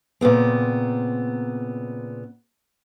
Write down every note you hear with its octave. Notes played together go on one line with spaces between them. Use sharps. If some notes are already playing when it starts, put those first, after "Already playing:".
A#2 C#3 B3 C4